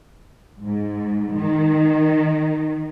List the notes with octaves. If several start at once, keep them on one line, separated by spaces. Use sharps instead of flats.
G#2
D#3